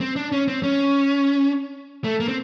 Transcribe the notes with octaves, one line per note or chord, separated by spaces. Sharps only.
C4
D4
C#4
C4
C#4
A3
A#3
C4